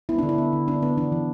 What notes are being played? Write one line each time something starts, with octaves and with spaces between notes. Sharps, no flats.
B3 E4
D3 D4
E4
B3
D3
B3 D4
D3 B3
E3 D4
E3